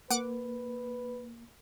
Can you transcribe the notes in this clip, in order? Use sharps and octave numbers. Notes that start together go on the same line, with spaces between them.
A#3 B4 F#5 D6